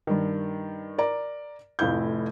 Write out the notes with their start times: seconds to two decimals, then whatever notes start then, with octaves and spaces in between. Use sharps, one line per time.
0.07 G2 D#3
0.98 A#4 D5 A#5
1.79 F1 F2 A2 E4 F5 G6